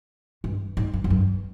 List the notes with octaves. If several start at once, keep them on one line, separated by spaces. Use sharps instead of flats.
G2
G#2
G2
F#2
G2